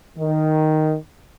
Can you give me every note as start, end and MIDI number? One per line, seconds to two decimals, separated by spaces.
0.17 0.95 51